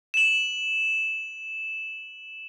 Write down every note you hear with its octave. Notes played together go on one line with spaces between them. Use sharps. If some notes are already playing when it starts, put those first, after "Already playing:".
E7 F#7